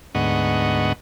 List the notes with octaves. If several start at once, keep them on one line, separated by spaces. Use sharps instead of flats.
D2 G#2 B3 D#5 F#5 C#6